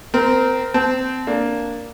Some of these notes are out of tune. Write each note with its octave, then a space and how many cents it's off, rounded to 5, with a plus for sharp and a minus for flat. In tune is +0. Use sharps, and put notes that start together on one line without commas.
C4 -25 A#4 +0
C4 -20 A5 -20
A#3 +0 D4 -10